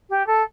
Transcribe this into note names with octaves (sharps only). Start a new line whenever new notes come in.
G4
A4